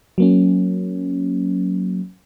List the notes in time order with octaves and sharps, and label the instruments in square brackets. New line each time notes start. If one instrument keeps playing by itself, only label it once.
[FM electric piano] F#3 A#3 C#4